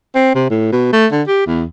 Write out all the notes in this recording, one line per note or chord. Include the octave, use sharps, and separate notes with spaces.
C4
C3
A2
B2
A3
D3
G4
E2